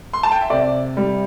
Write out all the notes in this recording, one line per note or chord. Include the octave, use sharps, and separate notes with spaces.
C6
A5
G5
E5
C3 D5
G3